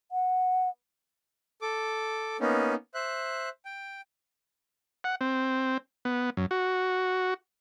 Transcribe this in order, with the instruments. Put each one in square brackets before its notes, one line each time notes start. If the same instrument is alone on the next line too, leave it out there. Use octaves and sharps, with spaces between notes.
[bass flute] F#5
[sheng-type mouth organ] A4 D6
A#3 B3 C#4 D#4
C5 E5 F#6
G5
[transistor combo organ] F#5
C4
B3
F#2
F#4